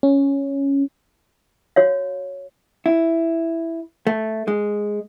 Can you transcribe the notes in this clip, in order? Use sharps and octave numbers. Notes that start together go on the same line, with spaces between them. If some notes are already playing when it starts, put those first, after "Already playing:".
C#4
F#4 C#5 F5
E4
A3
G#3